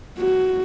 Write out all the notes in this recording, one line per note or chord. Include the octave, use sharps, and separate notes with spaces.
F#4